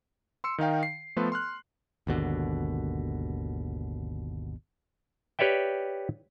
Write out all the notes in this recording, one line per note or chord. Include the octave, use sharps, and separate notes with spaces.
C6 E6 C#7
D#3 D#4 F5 G5
C7
F3 A3 B3 A4 B4 C6
C6 F6 F#6
G#1 D#2 B2 D3
G4 B4 C#5 D5 E5 G5